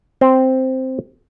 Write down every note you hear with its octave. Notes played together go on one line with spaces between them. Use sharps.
C4 C5